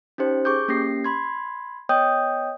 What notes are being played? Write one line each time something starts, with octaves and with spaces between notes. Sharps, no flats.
C#4 D#4 G4 C5
G#4 C#6 D6 G6
A#3 C#4 G4 A#6 C7
B5 C6 G#6
B3 C#5 D#5 G5 D#6 G6